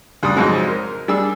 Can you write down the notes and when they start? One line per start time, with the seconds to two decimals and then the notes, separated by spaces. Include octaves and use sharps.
0.23 C#2 G3 D4 D#6
0.36 F2 G#2 F#3 G#3 C4
0.68 A#4
1.08 G3 D4 G#4 E6